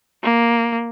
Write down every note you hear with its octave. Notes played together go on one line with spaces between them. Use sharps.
A#3